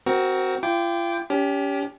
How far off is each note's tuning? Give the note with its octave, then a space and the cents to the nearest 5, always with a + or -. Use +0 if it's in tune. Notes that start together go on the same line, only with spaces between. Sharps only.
C4 +0 F#4 +15 A#4 +15
F4 -40 G5 +0 D6 +0
C#4 +35 G4 +0